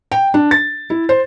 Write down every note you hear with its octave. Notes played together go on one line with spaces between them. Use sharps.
G5
D4
A6
E4
C5